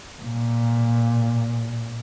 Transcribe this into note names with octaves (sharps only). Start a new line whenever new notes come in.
A#2